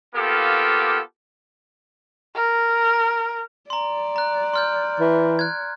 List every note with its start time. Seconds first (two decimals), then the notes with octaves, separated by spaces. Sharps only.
0.15 A#3 B3 F4 G4 A4
2.36 A#4
3.70 D5 A#5 C6
4.16 A#5 F#6
4.54 C6 F6 G6
5.00 E3
5.39 F#6 G#6